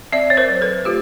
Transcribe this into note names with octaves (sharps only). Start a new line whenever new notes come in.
C4 D5 E5
C#5
A#4 C5
F#3
A4 B4
A3 F4 G4